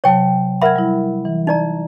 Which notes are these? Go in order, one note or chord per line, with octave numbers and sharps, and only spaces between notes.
C3 F#3 C#5 G5 A5
A#4 E5 F#5 B5 F6 G#6
G3 E4
E3
D#4 D5 A#5